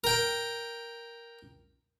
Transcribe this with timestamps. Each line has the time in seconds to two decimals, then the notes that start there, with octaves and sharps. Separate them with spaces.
0.04 A#4 G5